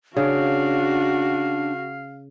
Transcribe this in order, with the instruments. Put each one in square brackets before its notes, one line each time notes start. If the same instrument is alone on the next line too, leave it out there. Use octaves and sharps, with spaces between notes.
[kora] C#3 [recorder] D4 [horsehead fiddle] F#4 [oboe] F5